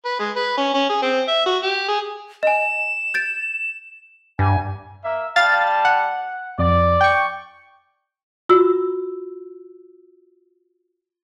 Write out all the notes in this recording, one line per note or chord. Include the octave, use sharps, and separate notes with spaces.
B4
G#3
B4
C#4
C#4
G#4
C4
E5
F#4
G4
G#4
D#5 G#5 E7
G6 A6 D7
G2 G#5
A#3 E5
G3 F5 A5 A6
F#5
F2 D5
G5 C#6
F4 F#4 E6